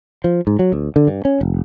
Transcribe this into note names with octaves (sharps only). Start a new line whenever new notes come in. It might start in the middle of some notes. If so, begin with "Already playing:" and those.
F3
G#2
F#3
D2
D3
G2
C#4
F1